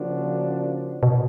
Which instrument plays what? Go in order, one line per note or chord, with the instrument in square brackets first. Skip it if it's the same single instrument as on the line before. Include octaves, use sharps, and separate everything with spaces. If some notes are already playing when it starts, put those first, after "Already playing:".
Already playing: [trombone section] C#3 F3 A#3 D4 F#4
[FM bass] B2